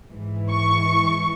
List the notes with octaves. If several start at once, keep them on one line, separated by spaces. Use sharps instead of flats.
G#2 E3
C#6